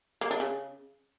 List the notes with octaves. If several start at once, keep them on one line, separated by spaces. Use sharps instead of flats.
A#3
D4
C#3